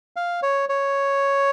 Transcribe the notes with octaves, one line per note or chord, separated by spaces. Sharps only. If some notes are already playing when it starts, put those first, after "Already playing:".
F5
C#5
C#5